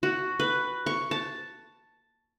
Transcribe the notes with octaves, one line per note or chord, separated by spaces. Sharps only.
F#4
B4
C#6
A5